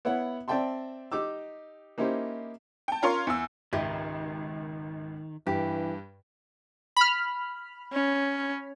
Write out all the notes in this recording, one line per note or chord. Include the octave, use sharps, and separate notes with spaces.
B3 E4 C#5 F#5
C4 D5 E5 G5 A5 C6
D#4 G4 D6 E6
A#3 C#4 D#4 E4 G4 C5
G5 A5
C#4 F4 A#4 C#5 F5 C6
E2 E6
G#1 C#2 D#3 G4 D#5 E5
G2 E3 G4
B5 F6
C#4